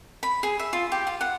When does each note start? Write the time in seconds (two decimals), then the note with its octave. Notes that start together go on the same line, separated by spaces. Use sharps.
0.23 B5
0.43 G#4
0.59 E5
0.73 F4
0.92 G4
1.07 F4
1.21 F#5